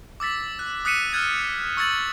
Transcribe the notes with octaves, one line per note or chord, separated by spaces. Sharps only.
D6 E6 A6 B6
F#6
D#6 F#6 B6 C#7 D#7 E7
F6 F#6 G#6 A6 D#7
C#6 E6 G#6 A6 F#7